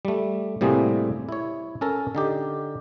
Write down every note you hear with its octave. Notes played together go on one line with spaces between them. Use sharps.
G3 A3
A2 C3 G3 A#3 C4 G#4
E4 C#5
C#4 A4 A#4
D3 D#4 G4